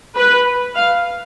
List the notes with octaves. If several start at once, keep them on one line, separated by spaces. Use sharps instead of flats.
B4
F5